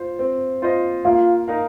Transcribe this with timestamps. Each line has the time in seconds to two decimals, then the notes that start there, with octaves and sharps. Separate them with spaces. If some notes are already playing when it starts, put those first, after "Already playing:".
Already playing: F4 C5
0.19 C4
0.62 F4 C5 D#5
1.04 A#3 F4 F5
1.48 D#4 A#4 F5